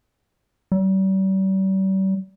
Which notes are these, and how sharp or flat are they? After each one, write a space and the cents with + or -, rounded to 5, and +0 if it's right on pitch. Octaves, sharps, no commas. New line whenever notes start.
G3 -40